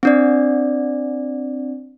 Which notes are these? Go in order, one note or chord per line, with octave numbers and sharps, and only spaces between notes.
C4 D4 D5